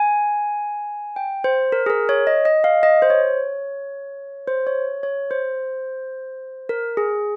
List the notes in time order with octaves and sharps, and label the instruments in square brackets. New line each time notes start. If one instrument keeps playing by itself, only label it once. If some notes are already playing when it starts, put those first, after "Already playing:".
Already playing: [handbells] G#5
G5
C5
A#4
G#4
A#4
C#5
D#5
D#5
F5
D#5
C5
C#5
C5
C#5
C#5
C5
A#4
G#4